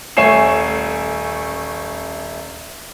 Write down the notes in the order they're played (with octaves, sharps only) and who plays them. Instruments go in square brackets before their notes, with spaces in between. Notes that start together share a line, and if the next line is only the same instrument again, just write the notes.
[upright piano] D#1 A3 C#5 G#5 C7 E7